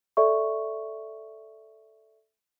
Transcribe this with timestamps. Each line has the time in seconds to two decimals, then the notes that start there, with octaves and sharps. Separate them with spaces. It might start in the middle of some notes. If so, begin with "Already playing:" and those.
0.17 A4 D5 E5 C#6